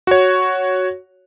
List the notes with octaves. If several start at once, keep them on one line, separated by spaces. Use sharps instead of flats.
F#4 C#5